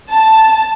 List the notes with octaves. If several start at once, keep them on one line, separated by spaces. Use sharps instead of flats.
A5